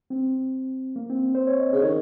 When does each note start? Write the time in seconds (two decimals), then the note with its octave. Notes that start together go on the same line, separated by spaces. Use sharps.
0.10 C4
0.96 A#3
1.10 C4
1.35 C5
1.47 C#5
1.60 D#5
1.73 C#3
1.81 D#3 C#5